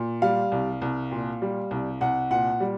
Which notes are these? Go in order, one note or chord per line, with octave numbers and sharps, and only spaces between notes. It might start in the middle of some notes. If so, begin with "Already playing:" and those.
Already playing: A#2
G3 F5
C2
C2
A#2
G3
C2
C2 F#5
A#2 F#5
G3